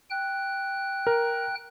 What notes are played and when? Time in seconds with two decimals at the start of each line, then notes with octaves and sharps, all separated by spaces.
0.10 G5 F#6
1.07 A#4